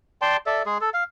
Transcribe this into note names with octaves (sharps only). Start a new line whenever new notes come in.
D5 G5 A5 C6
A4 D5 E5
G#3 G#4
A4
F5